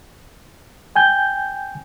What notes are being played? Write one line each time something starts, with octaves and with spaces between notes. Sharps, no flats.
G5 G#5 G6